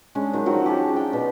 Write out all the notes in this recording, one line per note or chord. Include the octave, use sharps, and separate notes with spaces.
G#3 C#4 D4
D#3 F#3 D#4
F3 F#3 F#4 G5
G4 G#4 A5
D4 G5
B2